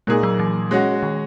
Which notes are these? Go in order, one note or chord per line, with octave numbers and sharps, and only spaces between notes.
A#2 G#3 A#3 D#4 G#4
F#3
E3
G#3 C#4 F#4
D#3